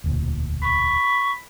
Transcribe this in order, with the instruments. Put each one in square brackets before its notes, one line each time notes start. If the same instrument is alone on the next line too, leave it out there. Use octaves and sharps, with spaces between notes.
[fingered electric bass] E1 D2 A#2
[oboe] B5 [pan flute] C#6